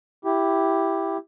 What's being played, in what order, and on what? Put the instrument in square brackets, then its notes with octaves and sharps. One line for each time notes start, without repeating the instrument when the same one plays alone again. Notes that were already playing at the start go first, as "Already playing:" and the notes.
[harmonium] E4 G4